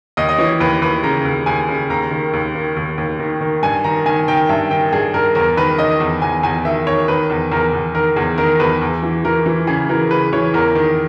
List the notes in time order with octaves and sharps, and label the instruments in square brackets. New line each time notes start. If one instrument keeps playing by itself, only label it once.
[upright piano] D#2 D#5
D#5
E3 C#5
D#2 B4
D#2 B4
C#3 A#5
D#2
D#2 G#5
C#3
D#2 A#5
D#3
D#2
D#3
D#2
D#2
D#3
D#3
G2 G#5
D#3 A#5
D#3 G#5
D#3 G5
G2 E5
D#3 G5
G2 G#4
G2 A#4
E2 A#4
D#3 B4
D#3 D#5
E2
E2 G#5
E2 G#5
D#3 E5
D#3 C#5
D#3 B4
E2
E2 A#4
E2
D#3 A#4
E2 G#4
D#3 A#4
E2 B4
E2
E3
E3 A#4
E3
C#3 G#4
E3 A#4
C#3 B4
E3 C#5
E2 A#4
D#3